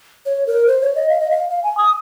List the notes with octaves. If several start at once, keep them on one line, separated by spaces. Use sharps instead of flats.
C#5
A#4
C5
C#5
D#5
F5
D#5
F5
F5
G#5
D#6